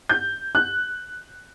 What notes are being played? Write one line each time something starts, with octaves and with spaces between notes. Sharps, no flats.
G6
F#6